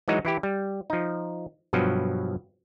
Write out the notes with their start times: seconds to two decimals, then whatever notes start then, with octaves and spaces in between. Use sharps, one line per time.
0.08 E3 F#3 G#3 D#4 F#4
0.25 E3 E4 G4
0.43 G3
0.90 F3 D#4
1.73 G2 B2 F3 F#3